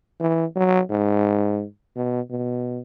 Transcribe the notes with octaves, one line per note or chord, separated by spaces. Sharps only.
E3
F#3
G#2
B2
B2